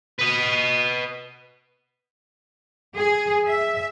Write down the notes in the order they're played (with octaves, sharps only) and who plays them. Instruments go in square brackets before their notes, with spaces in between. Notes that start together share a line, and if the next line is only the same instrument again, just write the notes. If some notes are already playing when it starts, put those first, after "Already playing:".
[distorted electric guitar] B4 D#5
[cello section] G#4
E5